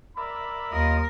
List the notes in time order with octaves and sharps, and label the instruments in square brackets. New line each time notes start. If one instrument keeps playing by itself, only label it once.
[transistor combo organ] A#4 D5 E5 [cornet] B5
[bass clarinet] D#2 [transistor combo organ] F4 D#5 D#6 [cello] A#4